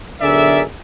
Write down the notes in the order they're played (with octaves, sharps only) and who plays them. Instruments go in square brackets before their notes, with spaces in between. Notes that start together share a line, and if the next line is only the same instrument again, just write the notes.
[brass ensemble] B1 D3 G#4 A#4 D5 E5